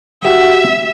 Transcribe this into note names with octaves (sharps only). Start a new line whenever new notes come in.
F#4 G4 E5 F#5